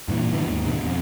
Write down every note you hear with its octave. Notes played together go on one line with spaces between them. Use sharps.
G2 A#2 E3
D3 E3 B3
D#2 G#2
B2 D3
F2